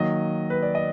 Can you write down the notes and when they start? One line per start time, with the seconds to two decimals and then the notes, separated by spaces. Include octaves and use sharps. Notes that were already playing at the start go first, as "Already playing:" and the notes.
Already playing: D#3 F#3 A#3 D#5
0.50 B4
0.63 D5
0.75 D#5